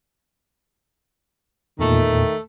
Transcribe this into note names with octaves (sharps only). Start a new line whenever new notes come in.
E2 A#2 D#3 A3